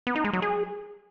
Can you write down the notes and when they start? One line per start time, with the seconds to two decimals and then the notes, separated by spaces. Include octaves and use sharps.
0.07 B3
0.16 D#4
0.24 G#3
0.33 F#3
0.42 G#4